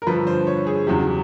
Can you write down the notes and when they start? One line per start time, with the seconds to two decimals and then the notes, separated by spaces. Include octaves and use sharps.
0.02 A#4
0.07 G2 D3 F3 B4
0.27 C5
0.47 C#5
0.67 G#4
0.87 E2 C#3 F#3 G4